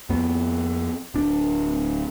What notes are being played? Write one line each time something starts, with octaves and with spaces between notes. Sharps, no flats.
F2 B3
D1 D4